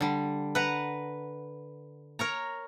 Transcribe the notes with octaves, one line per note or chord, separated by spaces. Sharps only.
D3 G3
B4 F#5 A#5
A#4 C#5 A#5